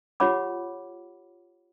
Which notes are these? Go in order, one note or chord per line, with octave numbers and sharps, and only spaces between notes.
F4 G4 C#5 F#5 B5 D6